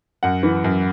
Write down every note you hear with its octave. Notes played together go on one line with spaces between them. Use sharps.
F#2 F#5
E3
F#2